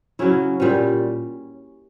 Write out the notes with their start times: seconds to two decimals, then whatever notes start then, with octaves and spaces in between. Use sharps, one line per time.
0.19 C#3 F#3 C#4 E4
0.60 A#2 G3 C#4